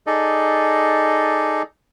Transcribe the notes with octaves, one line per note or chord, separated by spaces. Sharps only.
D#4 G#4 A4 D5 D#5